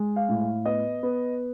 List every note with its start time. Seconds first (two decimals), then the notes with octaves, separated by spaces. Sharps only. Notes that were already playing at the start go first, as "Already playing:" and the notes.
Already playing: G#3
0.16 F5
0.29 A2
0.41 F5
0.65 B3 D#5
1.03 B3